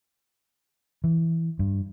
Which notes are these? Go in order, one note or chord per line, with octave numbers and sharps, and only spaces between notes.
E3
G2